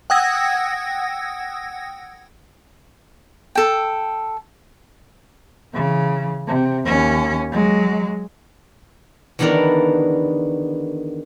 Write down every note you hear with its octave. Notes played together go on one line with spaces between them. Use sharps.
F#5 G5 D#6 E6 G#6 A#6
A4 G5
C#3 E3
C3
D#2 C#4
F#3 G#3
E2 D3 D#3 B3 D4 A#4